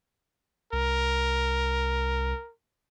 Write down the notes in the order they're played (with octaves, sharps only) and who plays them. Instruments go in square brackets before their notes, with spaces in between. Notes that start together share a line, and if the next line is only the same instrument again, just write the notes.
[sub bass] C2 [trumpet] A#4